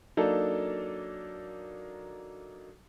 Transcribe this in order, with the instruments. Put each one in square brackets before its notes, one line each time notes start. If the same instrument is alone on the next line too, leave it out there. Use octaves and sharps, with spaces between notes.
[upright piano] F#3 A#3 D4 D#4 A4